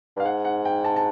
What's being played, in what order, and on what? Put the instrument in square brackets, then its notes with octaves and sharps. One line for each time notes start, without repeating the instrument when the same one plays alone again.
[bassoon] G2 [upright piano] F5
[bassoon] G#2 [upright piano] F#5
[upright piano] F#5
G5
A5
A5